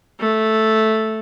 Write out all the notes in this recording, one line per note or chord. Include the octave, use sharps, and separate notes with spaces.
A3